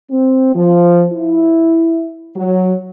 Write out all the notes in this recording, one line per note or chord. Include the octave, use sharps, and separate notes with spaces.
C4
F3
E4
F#3